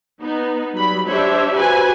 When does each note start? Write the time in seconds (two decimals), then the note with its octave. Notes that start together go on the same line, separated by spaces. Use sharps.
0.22 B3 D#4
0.74 F#3 G3 B5
1.08 D4 G4 C5 C#5 E5
1.56 F#4 G4 B4 C5 G#5